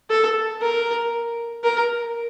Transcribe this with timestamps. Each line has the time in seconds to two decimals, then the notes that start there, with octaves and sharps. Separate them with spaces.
0.10 A4
0.62 A#4
1.64 A#4